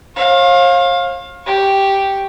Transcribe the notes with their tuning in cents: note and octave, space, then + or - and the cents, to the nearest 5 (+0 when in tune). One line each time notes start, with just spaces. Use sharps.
C#5 -45 F5 +15
G4 +0 C#6 +0